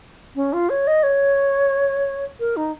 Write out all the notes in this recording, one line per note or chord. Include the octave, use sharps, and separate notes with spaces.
C#4
F4
C#5
D#5
C#5
A#4
D#4